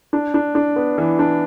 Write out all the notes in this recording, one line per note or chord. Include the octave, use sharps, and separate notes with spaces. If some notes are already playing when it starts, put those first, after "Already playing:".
D4
D4
D4
B3
E3
D4